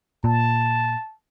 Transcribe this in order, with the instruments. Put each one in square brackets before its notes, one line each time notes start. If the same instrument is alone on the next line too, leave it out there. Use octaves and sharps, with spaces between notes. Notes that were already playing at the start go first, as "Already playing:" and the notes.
[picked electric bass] A#2 [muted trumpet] A5